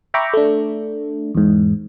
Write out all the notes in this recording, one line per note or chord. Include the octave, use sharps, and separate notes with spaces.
E5 G5 A#5 B5 C#6 D6
A3 D4
E2 G#2